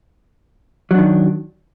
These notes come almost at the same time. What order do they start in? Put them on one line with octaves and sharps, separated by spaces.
F#3 D4 D#3